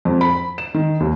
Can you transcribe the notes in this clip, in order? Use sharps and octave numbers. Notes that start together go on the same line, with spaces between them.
F2
B5
E7
D#3
D#2